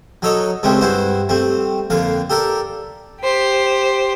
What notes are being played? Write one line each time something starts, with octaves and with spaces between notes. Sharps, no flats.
F#3 D#4 A4 C#5 D#5
C#2 C3 G#3 A3 C4 C#4
G2 E4 F#4 C5
G3 A3 C4
F2 D3 A#3 F5
G4 A4 A#4 D5
G4 C5